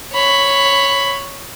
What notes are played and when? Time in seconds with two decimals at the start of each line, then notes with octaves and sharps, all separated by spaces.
0.12 C#5 B5